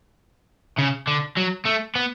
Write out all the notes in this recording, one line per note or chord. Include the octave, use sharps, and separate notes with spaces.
C#3
D3
F#3
A3
B3